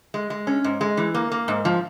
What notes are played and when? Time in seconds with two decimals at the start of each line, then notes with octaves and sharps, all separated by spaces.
0.14 G#3
0.30 G#3
0.47 C#4
0.64 G#2
0.81 G#3
0.97 E3
1.14 A#3
1.32 A#3
1.48 G#2
1.65 F3